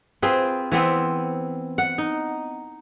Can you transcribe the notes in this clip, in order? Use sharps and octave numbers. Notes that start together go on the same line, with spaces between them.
C4 F4 G#4 B4
E3 B3 C4
F#5
D#4